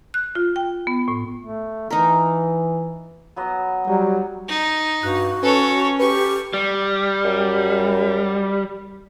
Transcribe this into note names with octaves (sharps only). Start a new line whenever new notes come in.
F#6
F4
G5
B3
A2
A3
E3 D#4 A#4
F#3 B3 D#5
F#3 G3 D#4
D#4
G2 F#4 F#6
C#4 A4 B4 C#5
G4 B4 C#6
G3
F#2